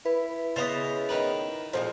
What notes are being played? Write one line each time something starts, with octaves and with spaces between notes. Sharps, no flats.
E4 B4
C#3 B3 C#4 C5 D#5 A6 F7
D#3 B4
F2 A#2 F3 G#3 C5